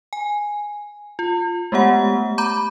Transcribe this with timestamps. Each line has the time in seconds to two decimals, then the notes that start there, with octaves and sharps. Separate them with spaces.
0.13 G#5
1.19 F4
1.72 G#3 A3 B3 G4 F#5
2.38 A#5 B5 D6 G6